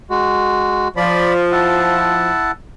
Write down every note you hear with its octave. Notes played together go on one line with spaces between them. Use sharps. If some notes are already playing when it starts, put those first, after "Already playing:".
G#3 F#4
F3 D5 B5
E4 F#5 A5